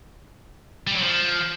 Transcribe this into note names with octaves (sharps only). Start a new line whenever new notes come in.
G3
F#3
F3